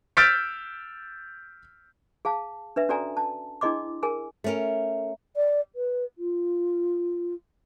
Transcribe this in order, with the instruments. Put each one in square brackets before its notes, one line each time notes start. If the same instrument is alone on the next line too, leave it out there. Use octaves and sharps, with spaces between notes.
[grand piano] E6 F6 G6 A6 B6 D7
[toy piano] G#4 F5 A5
D4 B4 E5
C#4 F#4 A4 D5 G#5 A#5
A5
D4 E4 G#4 D#5 C6 D6
G#4 A#4 G#5
[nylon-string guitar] A3 C#4 A#4
[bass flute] D5
B4
F4